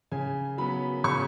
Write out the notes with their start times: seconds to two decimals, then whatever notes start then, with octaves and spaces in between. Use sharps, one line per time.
0.12 C#3 G#5
0.58 F#3 B3 B5
1.04 C#3 C#6